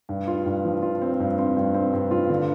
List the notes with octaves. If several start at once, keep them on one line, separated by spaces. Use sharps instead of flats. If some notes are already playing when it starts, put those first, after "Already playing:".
G2
F4
G2
F3
F4
C4
G2
C4
G2
C4
G2
F4
D3